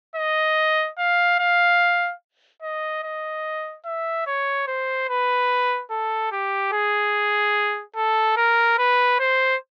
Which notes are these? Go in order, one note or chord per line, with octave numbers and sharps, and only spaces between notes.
D#5
F5
F5
D#5
D#5
E5
C#5
C5
B4
A4
G4
G#4
A4
A#4
B4
C5